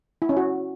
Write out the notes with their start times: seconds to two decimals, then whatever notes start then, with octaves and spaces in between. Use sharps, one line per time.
0.22 E4
0.29 C#4
0.37 F#4